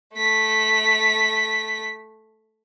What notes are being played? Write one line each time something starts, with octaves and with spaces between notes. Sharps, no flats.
A3 B6